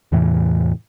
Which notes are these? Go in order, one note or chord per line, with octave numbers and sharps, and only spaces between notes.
E2 A2 C3 E3